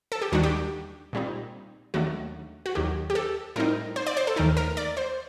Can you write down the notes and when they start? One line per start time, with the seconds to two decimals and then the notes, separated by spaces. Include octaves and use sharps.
0.12 A4
0.22 G4
0.32 D#2 D#3 G3 D4 F#4
0.43 G4
1.13 A#2 G3 C4 D#4
1.94 D#2 D#3 F#3 A3 D4 F#4
2.66 F#4
2.75 D#2 D#3 F#3 G4
3.10 G4
3.15 A4
3.56 A2 G3 C4 D#4 A#4
3.96 C5
4.07 D5
4.17 C5
4.27 A4
4.36 D#2 D#3 A3 D#4 A#4
4.57 A#4
4.77 D5
4.97 C5